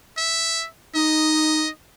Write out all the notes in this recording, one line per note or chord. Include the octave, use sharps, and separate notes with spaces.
E5
D#4 D#5